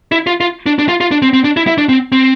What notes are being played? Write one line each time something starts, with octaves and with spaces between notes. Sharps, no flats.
E4
F4
F4
D4
D4
F4
F4
D4
C4
C4
D4
E4
E4
D4
C4
C4